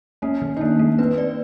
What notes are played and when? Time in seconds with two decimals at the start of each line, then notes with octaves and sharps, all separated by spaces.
0.22 A#3 C#4
0.42 D#3
0.57 D#4
0.61 A#3 D4
0.79 A#3
0.99 C4 B4
1.18 D5